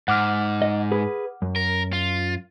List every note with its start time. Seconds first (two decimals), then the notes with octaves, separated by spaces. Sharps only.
0.08 G#2 F#5 D6 F6
0.62 D#5
0.92 G#4 B4
1.42 F#2
1.56 A#4
1.93 F4